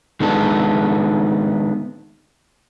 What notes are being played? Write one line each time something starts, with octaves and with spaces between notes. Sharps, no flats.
D#3 G#3 B3 D4 A4